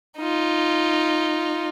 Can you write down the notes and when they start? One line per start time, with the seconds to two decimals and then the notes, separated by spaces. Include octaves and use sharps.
0.19 D#4 F4